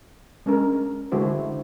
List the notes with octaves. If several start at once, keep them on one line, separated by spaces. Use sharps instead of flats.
G#3 C#4 D4 A#4
D3 G#3 E4 F#4 C5